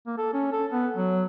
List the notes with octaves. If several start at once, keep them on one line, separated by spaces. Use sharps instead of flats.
A#3
A4
C#4
A4
B3
F#3